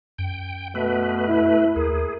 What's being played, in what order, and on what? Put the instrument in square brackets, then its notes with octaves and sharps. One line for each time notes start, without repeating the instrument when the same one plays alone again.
[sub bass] F#2 [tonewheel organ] G5
[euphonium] B2 [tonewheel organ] A3 B4
[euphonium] E4
[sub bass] D#2 [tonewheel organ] G#4 [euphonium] A#4